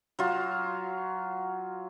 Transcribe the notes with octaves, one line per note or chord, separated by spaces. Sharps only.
F#3 F4